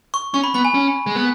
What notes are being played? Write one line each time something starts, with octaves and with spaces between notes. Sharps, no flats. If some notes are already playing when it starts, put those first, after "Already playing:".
C#6
C#4 C#6
B5
B3 B5
G#5
C#4
G#3
B3